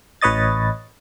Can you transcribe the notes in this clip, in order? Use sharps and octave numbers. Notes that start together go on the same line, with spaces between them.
A1 B4 C#5 D#5 A6